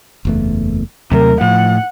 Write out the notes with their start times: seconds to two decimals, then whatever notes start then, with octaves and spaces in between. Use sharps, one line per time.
0.25 F#1 E2 A3
1.12 D#2 C3 F#3 A3 A#4
1.41 A2 F3 F#5